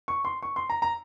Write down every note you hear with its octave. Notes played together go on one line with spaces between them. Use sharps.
C#6
C6
C#6
C6
A#5
A#5